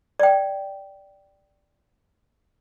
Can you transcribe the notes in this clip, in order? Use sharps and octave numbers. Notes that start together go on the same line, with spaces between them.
D5 G5